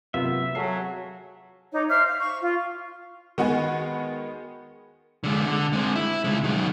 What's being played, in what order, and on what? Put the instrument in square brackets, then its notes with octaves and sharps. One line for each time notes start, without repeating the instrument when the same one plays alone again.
[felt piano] C3 F#3 F5 [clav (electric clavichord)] A#3 B3 F4 [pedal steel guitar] E5
[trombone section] F#3 [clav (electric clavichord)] G#4 A4 F5 [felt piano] C7
[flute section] D#4 C#5 D6
C5 E5 D6 F6
F5
C#6
F4
[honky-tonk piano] D#3 G#3 B3 F#4 G#4
[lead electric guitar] D3 G#3
D3
G#3 C4
E4
C#3 G#3
D#3 F#3